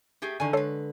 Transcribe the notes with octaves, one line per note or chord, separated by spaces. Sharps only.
A3 G4 G#4
D3 D#3 G#5
G#3 A4 B4 C#5 C7